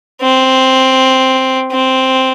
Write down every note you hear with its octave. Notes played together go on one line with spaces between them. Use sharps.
C4
C4